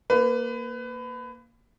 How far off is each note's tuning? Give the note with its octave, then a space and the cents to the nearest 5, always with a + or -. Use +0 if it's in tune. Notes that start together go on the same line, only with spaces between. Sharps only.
A#3 +0 B4 +25